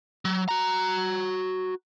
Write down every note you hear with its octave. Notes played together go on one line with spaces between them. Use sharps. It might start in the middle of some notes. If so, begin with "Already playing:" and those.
F#3
F#4 A#5